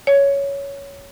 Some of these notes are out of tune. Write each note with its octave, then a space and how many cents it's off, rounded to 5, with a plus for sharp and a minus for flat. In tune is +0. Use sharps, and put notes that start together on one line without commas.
C#5 +10